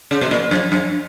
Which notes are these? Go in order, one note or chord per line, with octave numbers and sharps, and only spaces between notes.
C#3
B2
A#2
F#2
F#2